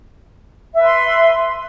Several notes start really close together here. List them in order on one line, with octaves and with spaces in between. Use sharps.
E5 B4 C6